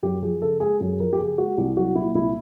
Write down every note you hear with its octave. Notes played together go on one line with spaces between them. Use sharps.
F#2 G4
F3 G#4
C#3 A4
G#3 G#4
F#2 G#4
F3 A#4
G4
C#3 G#4
G#3 F#4
C2 G4
F#3 F#4
A#2 E4
C2 E4